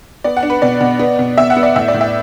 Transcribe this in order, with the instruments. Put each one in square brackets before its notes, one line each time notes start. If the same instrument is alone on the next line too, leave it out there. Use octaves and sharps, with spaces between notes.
[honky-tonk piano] B3 D5
F#5
D4
B4
B2 D5
B2
B3
B2
B2 E5
F#5
B3
D5
A2 E5
D5
A2
E5